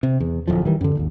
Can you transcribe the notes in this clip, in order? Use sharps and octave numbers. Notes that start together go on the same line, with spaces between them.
C3
E2
D1 F2 F3
D#3 E3 G3
F#2 D3
D1 G#1 D#2